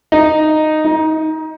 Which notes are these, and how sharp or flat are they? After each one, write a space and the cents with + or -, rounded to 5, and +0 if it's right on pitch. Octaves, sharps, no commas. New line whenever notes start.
D#4 -10
D#4 +20